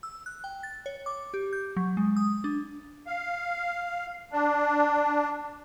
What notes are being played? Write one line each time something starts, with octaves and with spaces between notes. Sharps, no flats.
E6
F#6
G5
A6
C#5
D6
G4
G6
F#3
G#3
D#6
D4
F5
D4